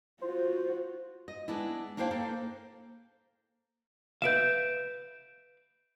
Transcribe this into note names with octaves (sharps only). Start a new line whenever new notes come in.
F4 F#4 C5
D#5
G#3 B3 D4 E4
A#3 D4 E4 C5 F5 G5
A#3 A4 C5
B4 E5 F5 G6 D7 E7